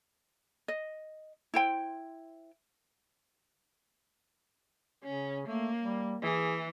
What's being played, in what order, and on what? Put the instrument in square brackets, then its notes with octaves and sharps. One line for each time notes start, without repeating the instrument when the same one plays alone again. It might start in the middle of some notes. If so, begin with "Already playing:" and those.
[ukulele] D#5
E4 C5 G5
[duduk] C#3 [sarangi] C#4
[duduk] A3 [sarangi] A#3
[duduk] G3
[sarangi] E3 [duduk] G#4